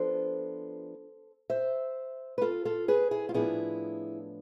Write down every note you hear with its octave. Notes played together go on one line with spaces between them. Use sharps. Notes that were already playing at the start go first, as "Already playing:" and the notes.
Already playing: F3 B3 D4 A4 C5
C5 E5
B4
F4 A4
F4 A4
G#4 B4
E4 G#4
F4
A2 F3 B3 D4 E4 G#4